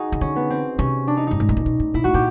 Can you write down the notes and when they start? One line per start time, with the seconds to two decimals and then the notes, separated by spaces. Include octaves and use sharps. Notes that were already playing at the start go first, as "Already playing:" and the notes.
Already playing: D#4 F#4 G#4
0.12 C#3
0.21 D3 C#4
0.36 B3
0.50 C4
0.78 C3 C#4
1.07 D4
1.17 D#4
1.27 G2 D#4
1.40 G#2
1.49 A2
1.57 A#2
1.66 B2
1.80 A2
1.94 A#2 E4
2.04 A2 F#4
2.14 A#2 G4